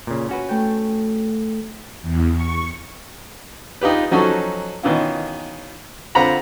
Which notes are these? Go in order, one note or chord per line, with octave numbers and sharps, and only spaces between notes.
A#2 C#3
C#4 F#4 B4
A3 G5
E2
C#6
D#4 F4 G4 B4
F3 F#3 C#4 D#4 F#4 A4
B2 D#3 E3 C#4 F4
D3 C4 F4 F#5 A#5 B5